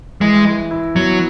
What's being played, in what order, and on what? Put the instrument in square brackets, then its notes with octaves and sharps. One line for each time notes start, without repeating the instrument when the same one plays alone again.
[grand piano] E3 [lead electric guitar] G#3
[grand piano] E3
E4
[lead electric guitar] F#3 [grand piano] B3